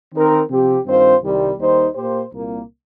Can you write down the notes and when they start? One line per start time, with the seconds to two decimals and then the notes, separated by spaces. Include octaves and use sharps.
0.13 D#3 C4 D#4 A#4
0.49 C3 F3 C4 G4
0.85 G2 D#3 C4 F4 C5
1.22 C2 C3 D#3 G3
1.57 D#2 D#3 G3 D#4 C5
1.95 A#2 A#3 G4 C5
2.31 C2 A#2 A#3